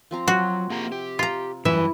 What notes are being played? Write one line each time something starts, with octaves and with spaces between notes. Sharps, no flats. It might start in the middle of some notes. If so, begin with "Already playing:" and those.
F3 C4 A#5
F#3 F#4
C3 A#3 G#4 A#5
G4
F4 A#5
F#2 E3 G3 E5